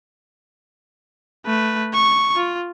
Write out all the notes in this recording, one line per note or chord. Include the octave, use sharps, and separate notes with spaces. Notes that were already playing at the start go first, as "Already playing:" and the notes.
A3 B4
C#6
F4